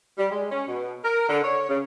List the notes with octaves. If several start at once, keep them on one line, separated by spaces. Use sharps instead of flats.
G3
G#3
C#4
B2
A#4
D3
C#5
C#3